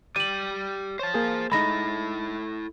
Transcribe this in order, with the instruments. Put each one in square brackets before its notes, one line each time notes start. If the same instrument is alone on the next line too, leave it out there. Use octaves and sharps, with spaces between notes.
[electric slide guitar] G4 D5 [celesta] D#7 F#7
[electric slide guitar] C5 A5 [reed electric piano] C#5
[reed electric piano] A#3 G#4
[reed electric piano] G#3 D#4 [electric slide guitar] E4 A4 [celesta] B5 A#6